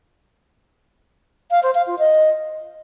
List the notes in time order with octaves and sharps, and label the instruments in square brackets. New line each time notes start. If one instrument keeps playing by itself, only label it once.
[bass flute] F5
C5
F5
F4
D#5